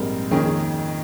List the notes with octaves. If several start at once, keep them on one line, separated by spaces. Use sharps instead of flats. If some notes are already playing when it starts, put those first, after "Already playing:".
Already playing: A#1 G#2 G3 C4 A#4
F2 D#3 A#3 C#4 G#4
G#4